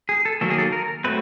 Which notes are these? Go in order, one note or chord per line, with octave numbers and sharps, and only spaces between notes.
G#4
A4
D#3 F#3 A#3 A4
G#4
A4
A#4
F#3 A3 C4 B4